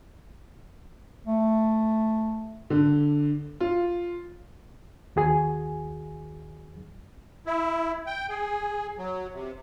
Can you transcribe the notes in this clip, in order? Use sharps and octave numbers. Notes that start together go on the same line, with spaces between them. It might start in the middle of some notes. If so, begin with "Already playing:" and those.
A3
D3
F4
D#2 F#4 G#4 G#5
E4
G5
G#4
F#3
C3